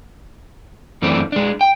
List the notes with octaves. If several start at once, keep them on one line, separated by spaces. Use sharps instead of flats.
F#2 E3 A3 C4 D4
G#3 D4
G5